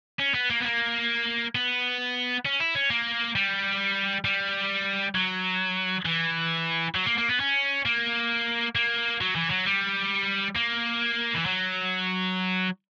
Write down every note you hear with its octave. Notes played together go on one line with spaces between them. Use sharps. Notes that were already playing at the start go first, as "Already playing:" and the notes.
C#4
B3
A#3
B3
A#3
B3
C#4
E4
C#4
A#3
G3
G3
F#3
E3
F#3
A#3
A#3
B3
C#4
A#3
A#3
F#3
E3
F#3
G3
A#3
E3
F#3